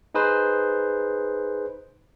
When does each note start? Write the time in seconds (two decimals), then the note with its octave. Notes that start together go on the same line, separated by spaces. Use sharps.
0.14 D#4 G#4 B4 C5